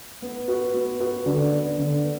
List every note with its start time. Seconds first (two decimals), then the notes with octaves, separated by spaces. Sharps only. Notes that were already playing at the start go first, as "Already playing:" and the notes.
0.22 B3
0.48 F#4 B4
0.74 B3
1.00 F#4 B4
1.26 D3
1.52 B3 D4 B4
1.78 D3
2.04 B3